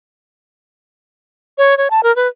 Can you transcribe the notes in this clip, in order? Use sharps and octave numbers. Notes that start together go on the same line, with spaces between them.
C#5
C#5
A5
A#4
B4